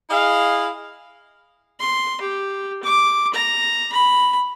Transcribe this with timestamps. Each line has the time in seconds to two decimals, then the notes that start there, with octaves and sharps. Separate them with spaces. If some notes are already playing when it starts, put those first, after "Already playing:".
0.10 E4 G#4 D#5 F5
1.80 C6
2.21 G4
2.83 D6
3.33 A#5
3.92 B5